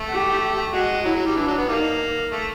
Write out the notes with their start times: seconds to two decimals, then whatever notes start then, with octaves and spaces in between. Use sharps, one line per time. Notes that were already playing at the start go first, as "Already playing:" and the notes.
Already playing: A3
0.09 G4
0.72 G#3 F#4
1.04 F#3 E4
1.16 F#3
1.26 G3
1.36 E3 D4
1.47 F#3
1.58 B3
1.68 G3 A#3 D#4
2.32 A3